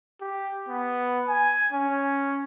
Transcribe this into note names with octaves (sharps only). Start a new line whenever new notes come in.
G4
B3
G#5
C#4